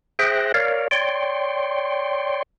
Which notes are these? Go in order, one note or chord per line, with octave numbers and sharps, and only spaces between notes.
G#4 C5 E5 G5 F#6 A#6
A#4 C#5 D5 F5
C#5 D5 G5 C6